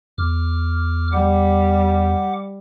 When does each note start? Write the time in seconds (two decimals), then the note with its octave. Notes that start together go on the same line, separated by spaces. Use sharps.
0.18 E2 D6 F6
1.12 G3 F#5 D6